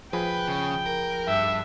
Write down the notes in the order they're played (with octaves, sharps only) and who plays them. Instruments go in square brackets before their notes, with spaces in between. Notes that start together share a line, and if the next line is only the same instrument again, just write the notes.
[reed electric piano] F3 G#4 B5 [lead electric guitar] B4 [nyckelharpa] G5
[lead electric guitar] C#3
A#4
[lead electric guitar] G2 [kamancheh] E5